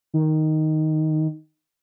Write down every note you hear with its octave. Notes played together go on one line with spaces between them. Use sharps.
D#3